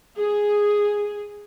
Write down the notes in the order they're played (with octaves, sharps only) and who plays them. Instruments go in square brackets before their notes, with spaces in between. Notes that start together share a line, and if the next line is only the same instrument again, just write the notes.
[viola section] G#4